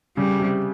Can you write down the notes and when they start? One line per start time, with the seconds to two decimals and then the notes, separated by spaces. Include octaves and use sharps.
0.17 C#3 G3
0.40 C3